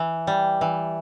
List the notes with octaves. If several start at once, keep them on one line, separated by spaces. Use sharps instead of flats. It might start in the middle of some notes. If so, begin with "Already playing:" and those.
Already playing: E3
G3
E3